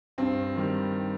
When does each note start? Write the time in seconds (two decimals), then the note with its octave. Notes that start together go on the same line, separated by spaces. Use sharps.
0.18 G2 C4
0.56 D#3 G3